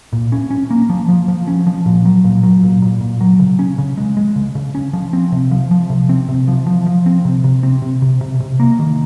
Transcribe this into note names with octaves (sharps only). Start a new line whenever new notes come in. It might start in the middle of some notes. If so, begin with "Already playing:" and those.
A#2
C#4
C#4
A#3
F3
F3
F3
C#4
F3
A#2
F#3
A#2
F#3
A#2
A#2
A#2
F#3
C#3
C#4
C#3
G#3
G#3
C#3
C#3
C#4
F3
C4
C3
F3
F3
C3
C4
C3
F3
F3
F3
C4
C3
C3
C4
C3
C3
C3
C3
A#3
D#3